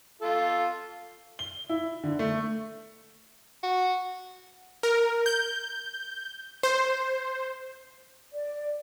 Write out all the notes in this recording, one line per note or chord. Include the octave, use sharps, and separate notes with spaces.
F4 A4
G7
E4
D3
A3
F#4
A#4
G6
C5
D5